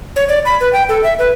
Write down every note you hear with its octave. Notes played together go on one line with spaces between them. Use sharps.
C#5
D5
B5
B4
G5
A4
E5
B4